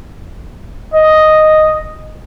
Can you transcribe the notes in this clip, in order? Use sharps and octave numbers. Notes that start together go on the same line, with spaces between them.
D#5